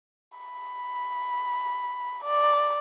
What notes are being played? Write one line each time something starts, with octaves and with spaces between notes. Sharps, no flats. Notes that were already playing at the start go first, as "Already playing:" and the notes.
B5
D5